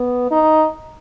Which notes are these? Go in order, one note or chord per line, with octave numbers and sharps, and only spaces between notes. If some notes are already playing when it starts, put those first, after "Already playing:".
Already playing: B3
D#4